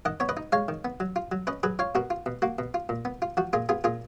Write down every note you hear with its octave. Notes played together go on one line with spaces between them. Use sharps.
D#3 D#5 F#5
B3 C#5
B4 D#5
D#4
G#3 C#5 F5
D#3
B3
F#3
F4
F#3
C#4 B4 D#5
F#3 G#4 B4
F4 C#5 F5
B2 F#4 A#4
F4
B2
A#3 F#4
B2
F4
A#2
B3
F4
F3 F#4
A#2 F4 G#4
B3 F4 G#4
A#2 F4 G#4